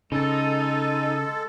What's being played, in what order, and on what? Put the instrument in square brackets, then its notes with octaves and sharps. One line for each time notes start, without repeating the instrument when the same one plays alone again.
[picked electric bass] C#3 [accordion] G#3 A4 [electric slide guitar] D#4